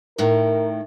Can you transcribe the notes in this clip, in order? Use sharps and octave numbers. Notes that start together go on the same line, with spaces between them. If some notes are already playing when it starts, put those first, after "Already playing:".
A2 D#3 A#4